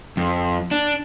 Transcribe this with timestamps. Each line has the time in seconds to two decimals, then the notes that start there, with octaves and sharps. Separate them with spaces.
0.17 F2
0.71 D4